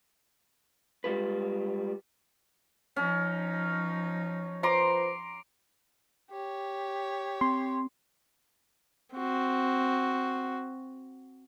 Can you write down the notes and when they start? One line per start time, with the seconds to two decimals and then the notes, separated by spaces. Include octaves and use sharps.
1.04 G3 G#3 F4 B4
2.96 F3 C#4 D#4
4.63 F4 B4 C5 A#5 C6 D6
6.31 G4 C#5
7.41 C4 C6
9.14 C4 F#4